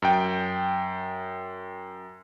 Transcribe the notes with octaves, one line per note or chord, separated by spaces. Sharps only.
F#2 G5